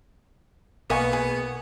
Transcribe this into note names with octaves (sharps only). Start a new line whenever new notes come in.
B1 A#3 B3 D#5 G#5 C#6
G#4